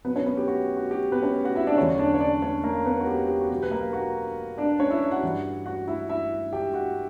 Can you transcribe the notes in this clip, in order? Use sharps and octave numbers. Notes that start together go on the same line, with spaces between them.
B2 F#3 B3 B4
C#4 C#5
B3 B4
G4
F#4
F#4
G4
B3 B4
C#4 C#5
F#4 F#5
E4 E5
D4 D5
E2 D3 F#3 C#4 C#5
D4 D5
C#5
D4 D5
C#4 C#5
A#3 A#4
B3 B4
F#4
G4
G4
F#4
B2 F#3 G4
B4
A#3 A#4
F#4 F#5
D4 D5
C#4 C#5
E4 E5
F#4 F#5
G2 E3 G3
F#4 F#5
E4 E5
E4 E5
G4 G5
F#4 F#5